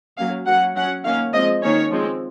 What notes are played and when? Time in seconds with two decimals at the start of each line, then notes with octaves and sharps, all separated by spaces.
0.18 F#3 A#3 C#4 F5
0.46 F#3 A#3 C#4 F#5
0.75 F#3 C#4 F#5
1.04 D#3 A#3 C#4 F5
1.33 F3 G#3 C4 D#5
1.62 D#3 A#3 C#4 C#5
1.91 F3 G#3 C4